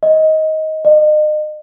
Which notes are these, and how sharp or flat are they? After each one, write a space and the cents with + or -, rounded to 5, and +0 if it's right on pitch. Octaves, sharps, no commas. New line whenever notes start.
D#5 +15
D#5 -35